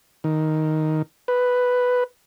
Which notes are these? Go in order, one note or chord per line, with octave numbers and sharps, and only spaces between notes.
D#3
B4